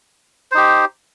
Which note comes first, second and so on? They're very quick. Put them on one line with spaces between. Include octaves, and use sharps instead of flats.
C5 D#4 G4